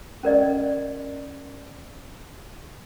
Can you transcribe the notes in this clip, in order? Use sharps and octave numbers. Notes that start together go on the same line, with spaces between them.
C#4 A#4 D5 D#5